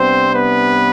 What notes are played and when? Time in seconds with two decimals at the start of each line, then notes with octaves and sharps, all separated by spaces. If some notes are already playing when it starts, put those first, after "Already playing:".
Already playing: C3 G3 B3 C4 D4 C5
0.35 B3 B4